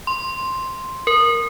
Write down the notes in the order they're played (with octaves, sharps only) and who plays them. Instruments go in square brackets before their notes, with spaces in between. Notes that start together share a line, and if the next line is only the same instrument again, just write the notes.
[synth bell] C6
A#4